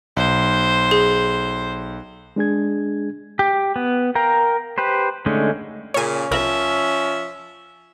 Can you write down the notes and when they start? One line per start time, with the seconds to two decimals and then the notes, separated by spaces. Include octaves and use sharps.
0.17 B1 C5
0.91 G#4
2.36 G#3 D4 G#4 G#6
3.39 G4
3.76 B3
4.15 A#4 F5 G5 A#5
4.78 G4 B4 C5
5.26 D3 G#3 A3 C#4 D#4
5.94 A#2 C#3 C#4 C#5 G#5
6.31 C2 F3 A#4 E5 B5